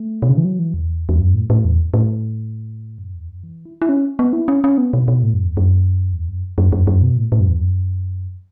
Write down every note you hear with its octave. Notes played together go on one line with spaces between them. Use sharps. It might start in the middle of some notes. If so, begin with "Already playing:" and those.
Already playing: A3
B2
C#3
E3
F#3
E3
E2
E2
F#2
A2
A2
E2
A2
F#2
E2
F#2
E3
E4
E4
C#4
B3
E4
C#4
C#4
B3
B2
B2
A2
F#2
E2
F#2
E2
F#2
F#2
F#2
F#2
B2
A2
A2
F#2
E2
F#2